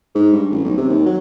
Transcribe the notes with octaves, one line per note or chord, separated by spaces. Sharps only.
G#2
G2
A1
B1
C3
D#2
F#3